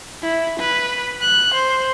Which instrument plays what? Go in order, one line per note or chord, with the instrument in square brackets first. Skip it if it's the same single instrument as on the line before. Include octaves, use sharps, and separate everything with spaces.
[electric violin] E4
B4
F#6
C5